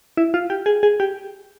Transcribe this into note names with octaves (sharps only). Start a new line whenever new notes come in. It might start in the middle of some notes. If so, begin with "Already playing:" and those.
E4
F4
G4
G#4
G#4
G4